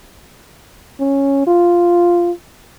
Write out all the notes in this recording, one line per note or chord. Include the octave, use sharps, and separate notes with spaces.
C#4
F4